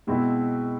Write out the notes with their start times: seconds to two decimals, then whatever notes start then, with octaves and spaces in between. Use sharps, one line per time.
0.07 B2 G#3 C4 E4